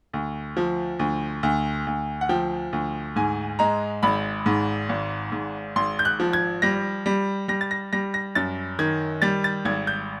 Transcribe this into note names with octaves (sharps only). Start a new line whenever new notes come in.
D2
F3
D2
D2
D2
F#5
F3 G5
D2
G#2 G#5
G#3 A#5
G#1 B5
G#2
G#1
G#2
G#1 C6
G6
F#6
F3
G#6
G3 A#6
G3
G3 A#6
A6
A#6
G3 A#6
A#6
F#2 A6
D#3 G#6
G3 A6
A6
G#1 G#6
G6